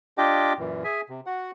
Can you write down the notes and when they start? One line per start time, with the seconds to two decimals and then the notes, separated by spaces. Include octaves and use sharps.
0.18 D4 F4 G4 D#5 G5 D6
0.59 F#2 A#2 E3
0.84 G#4 E5 G#5
1.09 C3
1.26 F#4 F#5